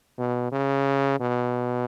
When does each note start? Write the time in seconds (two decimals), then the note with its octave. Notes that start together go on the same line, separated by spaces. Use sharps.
0.18 B2
0.52 C#3
1.20 B2